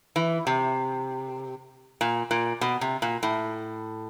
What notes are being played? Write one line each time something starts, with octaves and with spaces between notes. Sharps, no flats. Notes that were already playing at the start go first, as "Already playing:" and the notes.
E3
C3
A#2
A#2
B2
C3
A#2
A2